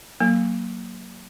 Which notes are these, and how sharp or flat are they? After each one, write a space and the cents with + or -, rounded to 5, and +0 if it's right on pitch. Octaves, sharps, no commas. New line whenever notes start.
F#3 +0 A#3 +0